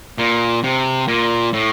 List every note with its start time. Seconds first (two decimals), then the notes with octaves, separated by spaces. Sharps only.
0.18 A#2
0.64 C3
1.08 A#2
1.53 A2